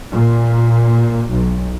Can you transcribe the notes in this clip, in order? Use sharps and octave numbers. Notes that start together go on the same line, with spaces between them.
A#2
B1